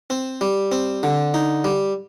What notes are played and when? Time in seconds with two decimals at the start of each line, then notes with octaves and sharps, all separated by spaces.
0.10 C4
0.41 G3
0.72 C4
1.03 D3
1.34 D#4
1.64 G3